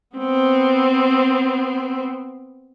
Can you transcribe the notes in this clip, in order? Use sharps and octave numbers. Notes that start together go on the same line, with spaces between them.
B3 C4